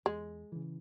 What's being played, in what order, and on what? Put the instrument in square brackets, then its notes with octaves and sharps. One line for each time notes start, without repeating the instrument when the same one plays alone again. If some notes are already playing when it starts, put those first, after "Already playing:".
[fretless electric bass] E2 [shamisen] G#3
[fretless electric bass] C#3 E3